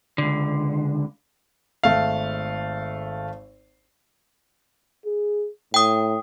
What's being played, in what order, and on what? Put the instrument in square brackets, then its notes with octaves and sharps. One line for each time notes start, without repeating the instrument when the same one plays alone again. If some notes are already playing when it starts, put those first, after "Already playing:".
[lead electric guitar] C#2 D3
[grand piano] G#1 A3 F5
[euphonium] G#4
[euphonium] A2 [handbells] G5 D#6